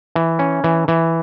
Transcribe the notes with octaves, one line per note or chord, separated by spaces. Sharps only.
E3
C#4
E3
E3